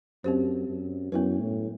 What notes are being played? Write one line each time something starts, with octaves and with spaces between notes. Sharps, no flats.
F#2 C4 G4 C5
F#2
F#2 B3 E4 B4
A2